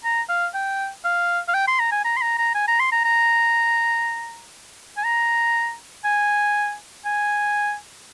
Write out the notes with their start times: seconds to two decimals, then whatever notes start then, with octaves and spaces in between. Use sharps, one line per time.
0.04 A#5
0.29 F5
0.54 G5
1.05 F5
1.48 F5
1.54 G5
1.67 C6
1.79 A#5
1.92 G#5
2.05 A#5
2.17 C6
2.21 A#5
2.38 A#5
2.54 G#5
2.68 A#5
2.80 C6
2.92 A#5
3.05 A#5
4.97 G#5
5.04 A#5
6.04 G#5
7.05 G#5